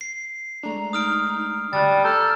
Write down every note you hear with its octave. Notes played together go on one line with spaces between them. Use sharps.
C7
G#3 A3 D4 A#5
D#4 D#6 F6 D7
D2 G3 A5 F#6 A6
A4 A#5 F6 G6